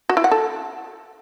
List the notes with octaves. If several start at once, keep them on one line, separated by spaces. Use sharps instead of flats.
F#4
E4
F#5
A4